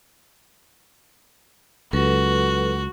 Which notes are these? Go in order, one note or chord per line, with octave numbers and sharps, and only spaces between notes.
C#2 F#3 F#4 A4 B4